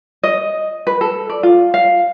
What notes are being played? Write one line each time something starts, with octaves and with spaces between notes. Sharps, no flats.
D#5
B4
A4
D5
F4
F5